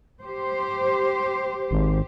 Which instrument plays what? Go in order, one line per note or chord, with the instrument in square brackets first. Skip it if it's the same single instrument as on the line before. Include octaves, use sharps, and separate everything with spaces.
[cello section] G4 C5
[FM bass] G#1